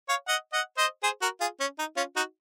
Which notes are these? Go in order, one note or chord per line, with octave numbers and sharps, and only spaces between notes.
C#5 F5
D#5 F#5
D#5 F#5
C5 D#5
G#4 C5
F#4 A#4
F4 G#4
C#4
D#4
C#4 F4
D#4 F#4